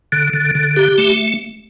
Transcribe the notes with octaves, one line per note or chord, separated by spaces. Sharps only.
D3
D3
D3
G4
A3